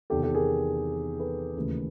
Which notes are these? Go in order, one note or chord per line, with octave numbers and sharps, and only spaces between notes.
E2 C3 D#3 G4 A4
G4 A4
G#4 A#4
A4 B4
D#2 C#3 E3 A3